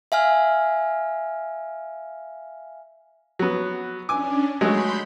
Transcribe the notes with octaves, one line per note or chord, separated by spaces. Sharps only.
E5 F5 G#5 F6
F#3 B3
C#4 D4 G#5 D6
F#3 G#3 A3 B5 C6 G6